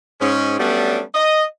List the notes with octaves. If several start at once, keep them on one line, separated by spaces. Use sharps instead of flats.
G#2 C#4
F#3 G3 A3 B3 C#4 D4
D#5